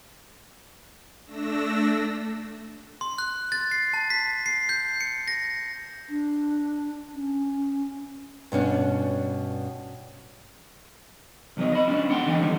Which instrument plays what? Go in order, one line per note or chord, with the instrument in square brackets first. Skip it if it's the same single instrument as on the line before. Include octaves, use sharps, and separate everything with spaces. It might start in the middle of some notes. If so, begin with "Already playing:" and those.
[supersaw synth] A3 D4 E6 A#6
[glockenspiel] C6
F#6
A6
C7
A5
B6
C7
G6
C#7
A#6
[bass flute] D4
C#4
[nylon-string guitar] G2 B2 C#4 D4
[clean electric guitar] C2 F#3 D#5
D#5 B5
G#3 C#4 D4
D4 F#5 G5 C6
D3 E3 A#3 D#5 G5
F2 D3 D#3 G3